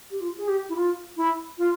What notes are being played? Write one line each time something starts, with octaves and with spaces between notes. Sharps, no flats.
G4
F4
G#4
G4
E4
F4
E4
F4